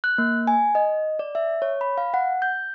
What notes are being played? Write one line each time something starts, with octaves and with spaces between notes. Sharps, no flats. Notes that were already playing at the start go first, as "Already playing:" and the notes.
F#6
A#3
G#5
D#5
D5
E5
C#5
B5
F5
F#5
G6